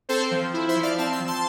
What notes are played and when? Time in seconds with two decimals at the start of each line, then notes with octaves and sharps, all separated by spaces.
0.09 C4 A4 C5
0.31 F3
0.54 E4
0.68 C5 E5
0.76 F3
0.83 D5 F5
0.98 C4 F5 A5
1.12 C6 E6
1.20 F3
1.27 A5 C6